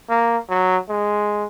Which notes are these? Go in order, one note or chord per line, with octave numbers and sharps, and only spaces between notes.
A#3
F#3
G#3